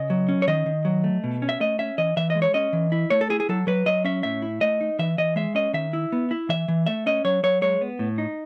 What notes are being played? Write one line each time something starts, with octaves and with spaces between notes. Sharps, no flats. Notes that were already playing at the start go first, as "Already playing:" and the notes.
Already playing: C#3 D#5
F#3
C#4
C#5
D#3 D#5
D#3
F#3
A3
B2
C#4
E5
A3 D#5
C#4 E5
E3 D#5
E3 E5
D#5
G#3
C#5
C#4 D#5
E3
E4
A3 C#5
A4
E4 G#4
G#4
F#3 A4
F#3 B4
F#3 D#5
C#4 E5
A2 E5
E4
A3 D#5
D#4
E3 E5
E3 D#5
G#3 E5
C#4 D#5
D#3 E5
E4
B3
E4
E3 E5
E3
A3 E5
C#4 D#5
F#3 C#5
F#3 C#5
G#3 C#5
B3
A2
D#4